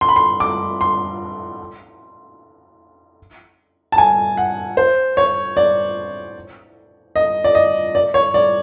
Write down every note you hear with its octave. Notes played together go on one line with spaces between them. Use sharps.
C6
B5
C6
D6
C6
A5
G#5
F#5
C5
C#5
D5
D#5
D5
D#5
D5
C#5
D5